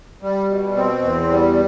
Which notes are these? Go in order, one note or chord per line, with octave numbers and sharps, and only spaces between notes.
G3
B2
C4
E2
G3